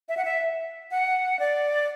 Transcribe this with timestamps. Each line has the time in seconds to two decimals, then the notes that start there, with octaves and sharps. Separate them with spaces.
0.09 E5
0.17 F#5
0.25 E5
0.91 F#5
1.39 D5